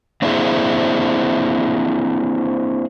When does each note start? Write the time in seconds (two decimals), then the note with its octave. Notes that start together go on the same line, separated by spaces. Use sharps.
0.22 A#3 C4 D4 E4 G#4 C5